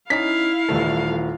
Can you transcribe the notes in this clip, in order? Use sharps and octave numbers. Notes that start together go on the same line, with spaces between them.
C#4 D#4 E4 F5 B6
D#1 E3 G3 A3 A4